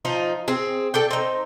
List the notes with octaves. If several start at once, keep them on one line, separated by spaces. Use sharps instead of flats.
F3 D#4 F4
C4 G#4
A4 D5 G5
C4 D#4